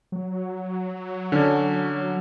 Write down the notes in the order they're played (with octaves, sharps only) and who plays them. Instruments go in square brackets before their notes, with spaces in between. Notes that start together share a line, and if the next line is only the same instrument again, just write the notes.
[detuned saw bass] F#3
[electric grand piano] D3 C#4